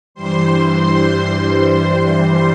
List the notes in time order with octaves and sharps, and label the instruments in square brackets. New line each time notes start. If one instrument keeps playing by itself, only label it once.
[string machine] G2 E3 G3 C5 C6